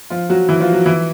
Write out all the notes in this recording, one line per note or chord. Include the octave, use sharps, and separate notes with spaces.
F3 F4
F#3 F#4
E3 E4
F3 F4
F#3 F#4
E3 E4